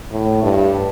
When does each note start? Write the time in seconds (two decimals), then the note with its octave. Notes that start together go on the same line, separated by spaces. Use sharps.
0.12 A2
0.43 G2